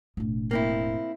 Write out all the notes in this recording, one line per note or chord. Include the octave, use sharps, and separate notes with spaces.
E1 A2
A#3 C4 E4